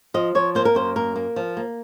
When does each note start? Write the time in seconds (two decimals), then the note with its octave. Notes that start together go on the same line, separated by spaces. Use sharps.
0.14 F3 D#5
0.35 F3 C#5
0.55 A#3 C5
0.65 A#4
0.75 F#2 C5
0.96 A#3 A#4
1.16 A#3
1.36 F3
1.57 A#3